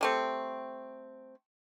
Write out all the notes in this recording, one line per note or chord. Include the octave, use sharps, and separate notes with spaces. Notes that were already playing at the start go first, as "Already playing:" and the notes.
G3 A3 C4